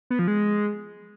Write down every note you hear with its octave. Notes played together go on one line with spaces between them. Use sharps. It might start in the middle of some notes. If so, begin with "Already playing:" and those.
B3
F3
G#3